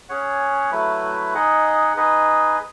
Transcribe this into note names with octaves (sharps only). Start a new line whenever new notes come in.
C#4 G#4 C#5 F#5
F#3 A3 E4 B4
D#4 G#4 D#5 F#5
D#4 G#4 B4 D#5